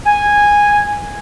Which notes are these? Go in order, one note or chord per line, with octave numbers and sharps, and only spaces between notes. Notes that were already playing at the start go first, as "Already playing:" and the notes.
G#5